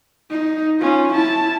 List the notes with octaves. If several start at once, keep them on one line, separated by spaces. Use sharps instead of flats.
D#4
C#4 F4
E4 A5